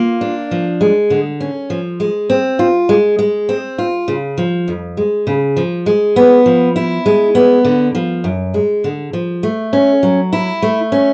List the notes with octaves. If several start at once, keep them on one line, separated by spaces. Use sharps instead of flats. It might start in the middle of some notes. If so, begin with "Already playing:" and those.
Already playing: A#3 F4
D4
F3
G#3
D3
C#4
F3
G#3
C4
F4
G#3
G#3
C4
F4
C#3
F3
F2
G#3
C#3
F3
G#3
B3
F3
E4
G#3
B3
D3
F3
F#2
G#3
D3
F3
A3
C#4
F#3
E4
A3
C#4